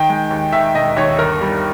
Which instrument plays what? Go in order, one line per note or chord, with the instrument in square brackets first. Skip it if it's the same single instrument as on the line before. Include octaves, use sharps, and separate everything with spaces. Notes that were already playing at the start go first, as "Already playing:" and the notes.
Already playing: [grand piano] D#3 G5
G#3
D#2
D#3 E5
E1 D#5
D#2 C#5
G1 A#4
G3